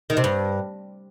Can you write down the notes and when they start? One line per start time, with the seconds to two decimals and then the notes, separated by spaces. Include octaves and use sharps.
0.10 D#3
0.17 C3
0.24 G2